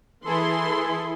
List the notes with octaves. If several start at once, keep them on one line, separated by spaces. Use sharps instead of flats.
E3 E4 G#4 A4 C6